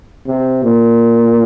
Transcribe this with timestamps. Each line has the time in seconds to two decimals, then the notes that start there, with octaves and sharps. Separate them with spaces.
0.28 C3
0.64 A#2